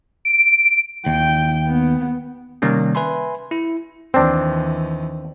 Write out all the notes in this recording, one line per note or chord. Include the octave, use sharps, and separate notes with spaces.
D7
D#2 G5
B3
C3 D#3 G3 A#3 C#4
B4 E5 G#5 B5 C6
E4
D#2 E3 C4 D4